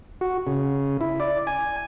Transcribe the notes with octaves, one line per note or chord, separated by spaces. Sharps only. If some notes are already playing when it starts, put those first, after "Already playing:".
F#4
C#3
E4
D5
G#5